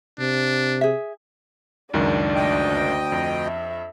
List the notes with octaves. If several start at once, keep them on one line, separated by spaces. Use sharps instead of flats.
C3 D4
G#4 E5
C#2 F#2 D#3 D4
D2 D#5 G5
F2
E5